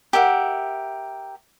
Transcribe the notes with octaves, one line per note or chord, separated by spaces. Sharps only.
G4 A#4 E5 F#5